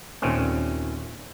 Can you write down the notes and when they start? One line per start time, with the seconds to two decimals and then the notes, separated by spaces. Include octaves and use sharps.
0.22 D#2 A#2 A3 C4 C#4